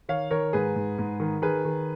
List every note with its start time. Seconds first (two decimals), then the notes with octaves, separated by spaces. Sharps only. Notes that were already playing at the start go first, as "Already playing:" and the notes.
0.09 D#3 C#5 F5
0.31 D#3 A#4 C#5
0.53 G#2 G#4 B4
0.76 G#2
0.98 G#2
1.20 D#3
1.42 D#3 G#4 B4
1.65 D#3